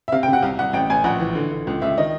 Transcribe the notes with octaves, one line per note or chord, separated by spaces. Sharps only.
E5
C3 F5
G5
C3 F#5
C2 F5
C2 F#5
A1 G5
A1 G#5
A#1 F#5
E3
D3
D3
C#2
C#2 E5
D#3 D#5